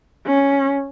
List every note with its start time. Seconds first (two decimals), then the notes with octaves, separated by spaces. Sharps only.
0.26 C#4